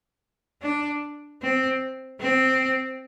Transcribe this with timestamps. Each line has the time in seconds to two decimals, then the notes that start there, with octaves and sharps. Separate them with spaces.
0.62 D4
1.42 C4
2.21 C4